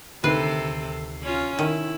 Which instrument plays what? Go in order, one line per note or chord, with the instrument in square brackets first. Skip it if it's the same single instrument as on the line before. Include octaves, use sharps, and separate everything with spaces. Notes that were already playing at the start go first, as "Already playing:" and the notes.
[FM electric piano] D2 D#3 C7 [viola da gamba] C3 A4 [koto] B4
[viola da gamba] C#4 F4
[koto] D#3 [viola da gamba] E4